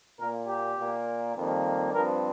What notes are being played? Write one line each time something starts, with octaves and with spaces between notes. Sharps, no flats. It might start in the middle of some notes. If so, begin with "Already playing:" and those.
A#2 A#3 A#4
G4
A#2 A#3
F2 D#3 G3 A#3
G2 F3 C4 A#4